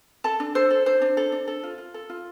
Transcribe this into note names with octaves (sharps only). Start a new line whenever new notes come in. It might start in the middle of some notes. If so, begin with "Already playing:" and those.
A4 A5
D4
A4 C5
A4
D4 C5
D4
A4
D4
A4
F4
F4
A4
F4